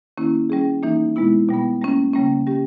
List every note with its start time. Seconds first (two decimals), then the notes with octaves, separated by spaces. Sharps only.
0.17 D#3 A#3 C#4 E4
0.50 G3 C#4 G#4
0.83 E3 A#3 D#4
1.16 B2 G#3 B3 E4
1.49 B2 G3 B3
1.81 G3 A#3 C#4
2.13 C#3 G3 A#3 C#4
2.47 G3 C#4 G4